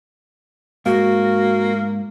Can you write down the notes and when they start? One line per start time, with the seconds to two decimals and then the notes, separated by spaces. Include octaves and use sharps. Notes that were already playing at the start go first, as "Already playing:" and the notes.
0.86 G#2 A#3 F#4